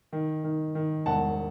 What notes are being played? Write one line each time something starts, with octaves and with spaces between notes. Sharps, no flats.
D#3
D#3
D#3
E1 F#5 A5